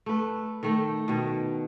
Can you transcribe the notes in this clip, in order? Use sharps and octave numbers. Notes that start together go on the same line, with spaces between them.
A3 B4
D#3 A3 G5
B2 D#3